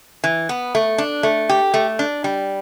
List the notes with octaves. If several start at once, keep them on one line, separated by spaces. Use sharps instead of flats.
E3
B3
A3
D4
A3
G4
A3
D4
G3